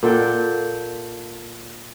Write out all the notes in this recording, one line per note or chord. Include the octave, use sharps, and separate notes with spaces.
A#2 A4 F#5 G5